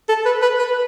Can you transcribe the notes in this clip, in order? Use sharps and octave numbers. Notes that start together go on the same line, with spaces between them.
A4
B4
B4
B4